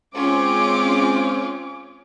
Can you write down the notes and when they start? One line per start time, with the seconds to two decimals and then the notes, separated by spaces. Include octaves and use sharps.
0.15 G#3 C4 C#4 F4 G#4 D6